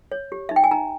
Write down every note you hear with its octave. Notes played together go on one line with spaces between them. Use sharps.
C#5
G4
D#4 E5
G5
G#5
D#4 A#5